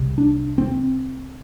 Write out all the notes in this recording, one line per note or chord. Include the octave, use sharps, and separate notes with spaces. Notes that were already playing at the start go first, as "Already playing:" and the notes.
Already playing: C2 C3
D4
C4